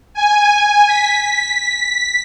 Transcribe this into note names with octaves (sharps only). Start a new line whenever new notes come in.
G#5
B6